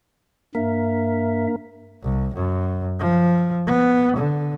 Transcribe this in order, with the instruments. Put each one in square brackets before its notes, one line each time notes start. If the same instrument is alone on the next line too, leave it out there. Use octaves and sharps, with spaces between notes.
[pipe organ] G2 E5 [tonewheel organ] A#3
[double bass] C2
F#2
F3
B3
D3